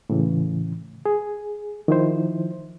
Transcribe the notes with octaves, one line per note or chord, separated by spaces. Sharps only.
A2 C#3 E3
G#4
D#3 F3 E4 C5